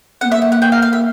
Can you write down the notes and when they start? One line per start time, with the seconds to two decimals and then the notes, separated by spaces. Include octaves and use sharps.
0.21 C4 F#5
0.25 A#3
0.32 E5
0.42 F#5
0.52 F#5
0.62 G5
0.72 F5
0.82 F5
0.93 E5